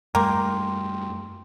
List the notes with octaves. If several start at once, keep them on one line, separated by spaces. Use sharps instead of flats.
F#2 G3 A3 A#3 G5 C6